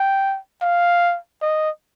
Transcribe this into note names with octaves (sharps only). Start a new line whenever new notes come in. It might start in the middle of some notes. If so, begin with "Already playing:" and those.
Already playing: G5
F5
D#5